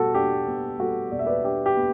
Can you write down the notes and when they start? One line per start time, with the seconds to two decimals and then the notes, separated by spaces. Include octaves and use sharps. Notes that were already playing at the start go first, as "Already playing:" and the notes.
Already playing: B2 G3 F#4 A4
0.14 D4 G4
0.47 B3
0.79 G3 F#4 A4
1.11 B2 D5
1.19 E5
1.26 B4 D5
1.44 D4 G4
1.66 G4
1.76 B3